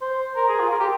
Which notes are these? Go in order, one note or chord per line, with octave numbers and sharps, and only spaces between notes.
C5
A#4
G#4
F4
A#4
G4